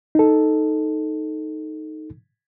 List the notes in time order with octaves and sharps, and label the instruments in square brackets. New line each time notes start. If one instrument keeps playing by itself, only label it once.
[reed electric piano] D#4 A4